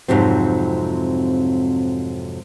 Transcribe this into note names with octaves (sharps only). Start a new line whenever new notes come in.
F2 G#2 C3 F#3 C4